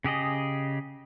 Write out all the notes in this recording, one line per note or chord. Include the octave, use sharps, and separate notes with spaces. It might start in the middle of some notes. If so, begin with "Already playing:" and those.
C#3 G4 G#4 D#5